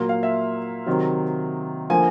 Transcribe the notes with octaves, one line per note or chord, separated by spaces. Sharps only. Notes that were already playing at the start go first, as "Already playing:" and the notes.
Already playing: A#2 F#3 A#3
F5
E5
C3 D#3 F#3
D3 F3 A#3 G#5